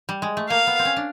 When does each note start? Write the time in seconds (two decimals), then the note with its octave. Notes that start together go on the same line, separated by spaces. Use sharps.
0.09 G3
0.22 G#3
0.37 A3
0.50 A#3 F5
0.67 B3
0.79 C4
0.85 C#4
0.96 D4